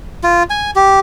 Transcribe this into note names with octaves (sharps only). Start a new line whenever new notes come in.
F4
G#5
G4